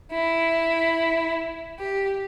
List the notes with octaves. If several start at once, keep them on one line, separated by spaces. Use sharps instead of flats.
E4
G4